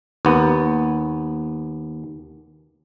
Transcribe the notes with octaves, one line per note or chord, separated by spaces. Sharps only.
D#2 B3